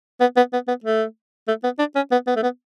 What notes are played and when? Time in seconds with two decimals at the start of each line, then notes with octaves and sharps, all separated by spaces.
0.21 B3
0.37 B3
0.53 B3
0.68 B3
0.84 A3
1.48 A3
1.64 B3
1.79 D4
1.95 C#4
2.11 B3
2.27 B3
2.36 A3
2.43 B3